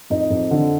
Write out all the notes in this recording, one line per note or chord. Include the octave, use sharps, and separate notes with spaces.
F2 D#4
F2
D3